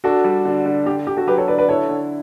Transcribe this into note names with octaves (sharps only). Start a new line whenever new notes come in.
D4 F#4 A4
G3
D3
D3
D3 G4
D3 G4
F#4 A4
F#3 G4 B4
A4 C#5
D3 B4 D5
B4 D5
E4 A4 C#5
D3